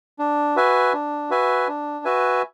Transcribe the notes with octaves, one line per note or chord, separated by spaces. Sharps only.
D4
F#4 B4 E5 G#5
D4
F#4 B4 E5 G#5
D4
F#4 B4 E5 G#5